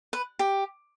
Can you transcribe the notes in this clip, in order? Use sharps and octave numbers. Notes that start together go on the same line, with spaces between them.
B4
G4